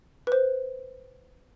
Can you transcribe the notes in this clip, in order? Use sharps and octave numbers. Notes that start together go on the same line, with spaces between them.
B4
C5